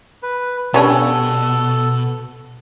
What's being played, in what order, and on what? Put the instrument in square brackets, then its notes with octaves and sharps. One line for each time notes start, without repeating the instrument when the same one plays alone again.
[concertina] B4
[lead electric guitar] B2 [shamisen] G3 C#4 D4 [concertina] A4